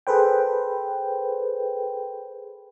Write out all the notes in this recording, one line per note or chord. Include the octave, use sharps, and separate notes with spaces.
G#4 A4 B4 C5 G5